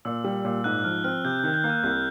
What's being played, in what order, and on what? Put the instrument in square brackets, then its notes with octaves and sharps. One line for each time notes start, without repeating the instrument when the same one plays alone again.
[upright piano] A#2 [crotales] E6
[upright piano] G3
A#2
[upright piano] G#2 [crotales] F#6
[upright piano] F3 [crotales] F6
[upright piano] C4 [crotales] F6
[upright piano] C3 [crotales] G6
[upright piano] D#3 [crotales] G6
[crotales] G6
[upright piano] A#3
[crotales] F#6
[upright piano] C2 [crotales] G6